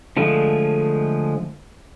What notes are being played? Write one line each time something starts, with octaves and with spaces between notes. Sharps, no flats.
D3 F3 G#3 A3